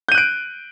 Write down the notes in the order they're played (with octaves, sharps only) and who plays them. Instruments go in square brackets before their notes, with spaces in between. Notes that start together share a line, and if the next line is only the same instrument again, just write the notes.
[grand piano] G6
D#7
F#6
D7